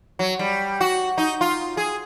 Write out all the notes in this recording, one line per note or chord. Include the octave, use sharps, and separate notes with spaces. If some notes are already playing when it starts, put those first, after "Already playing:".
F#3
G3
F#4
D#4
F4
G#4